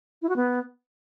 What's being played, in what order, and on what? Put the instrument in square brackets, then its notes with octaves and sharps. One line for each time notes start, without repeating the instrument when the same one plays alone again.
[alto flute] E4
F#4
B3